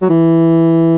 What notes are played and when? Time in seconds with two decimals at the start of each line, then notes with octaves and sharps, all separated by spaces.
0.01 F#3
0.10 E3